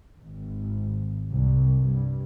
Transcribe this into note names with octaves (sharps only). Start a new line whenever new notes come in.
G#1
C2
G2